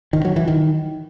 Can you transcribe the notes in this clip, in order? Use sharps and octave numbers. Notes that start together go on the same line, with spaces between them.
D#3
F#3
E3
D#3